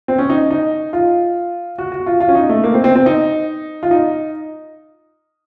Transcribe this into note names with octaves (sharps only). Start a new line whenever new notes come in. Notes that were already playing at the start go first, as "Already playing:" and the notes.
C4
C#4
D#4
D#4
F4
F#4
F#4
F4
F4
C#4
D#4
A3
A#3
C4
C4
C4
D#4
F4
D#4